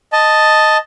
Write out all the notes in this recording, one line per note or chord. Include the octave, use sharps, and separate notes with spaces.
D#5 A5